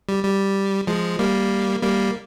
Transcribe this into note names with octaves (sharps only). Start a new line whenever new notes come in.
G3
G3
F3 G#3
G3 A#3
G3 A#3